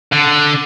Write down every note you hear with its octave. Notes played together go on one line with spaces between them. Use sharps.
D3